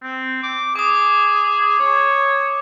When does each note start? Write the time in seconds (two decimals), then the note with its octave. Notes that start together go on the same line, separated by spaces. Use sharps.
0.02 C4
0.43 D6
0.76 G#4 D6 D#6
1.79 C#5